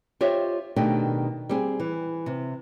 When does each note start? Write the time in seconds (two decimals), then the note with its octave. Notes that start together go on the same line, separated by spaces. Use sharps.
0.21 F4 G4 C5 C#5 D#5 E5
0.76 B2 D#3 A3 D4 G4
1.49 G3 C4 G#4
1.80 E3
2.26 C3